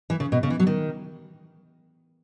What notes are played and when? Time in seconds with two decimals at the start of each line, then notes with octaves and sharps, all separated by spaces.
0.10 E3
0.20 C#3
0.32 B2
0.43 C#3
0.50 E3
0.60 F#3
0.67 D#3